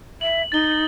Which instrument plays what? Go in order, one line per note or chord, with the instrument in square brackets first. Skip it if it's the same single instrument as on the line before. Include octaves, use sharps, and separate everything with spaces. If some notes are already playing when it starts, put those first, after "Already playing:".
[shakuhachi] E5 [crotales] F#7
[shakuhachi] D#4 [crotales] A6 G7